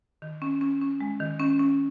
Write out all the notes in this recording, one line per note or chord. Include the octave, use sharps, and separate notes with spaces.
D#3
C#4
C#4
C#4
G#3
D#3
C#4
C#4